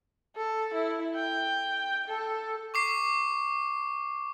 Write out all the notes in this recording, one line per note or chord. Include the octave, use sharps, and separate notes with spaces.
A4
E4
G5
A4
C#6 D6 C7